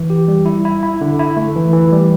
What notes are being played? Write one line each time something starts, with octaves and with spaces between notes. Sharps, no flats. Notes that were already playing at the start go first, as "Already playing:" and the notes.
Already playing: E3
G4
G3
E4
E4
E4
D3
E4
A3
E3
E3
G3